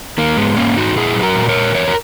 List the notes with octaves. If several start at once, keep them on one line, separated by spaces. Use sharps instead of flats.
D#3 A#3
G#2 G#3 B3
G#2 A#3 C#4
G#2 D#4 F#4
A#2 E4 G#4
F#3
F#4 A#4
A#2
A#4 C#5
A#2
E2 A#4 C#5
A#4